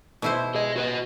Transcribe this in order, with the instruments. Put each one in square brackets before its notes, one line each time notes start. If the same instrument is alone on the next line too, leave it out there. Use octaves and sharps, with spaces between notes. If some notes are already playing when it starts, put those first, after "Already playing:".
[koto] B2 E4 C5
[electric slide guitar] G#4 D#5
F#4 B4 D#5